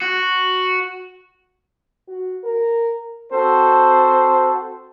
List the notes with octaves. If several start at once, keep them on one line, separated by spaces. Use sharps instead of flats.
F#4
F#4
A#4
C4 F#4 A4 C5